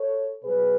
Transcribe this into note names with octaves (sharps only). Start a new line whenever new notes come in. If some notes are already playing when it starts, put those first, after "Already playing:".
Already playing: A4 C#5
B2 F#3 G#4 B4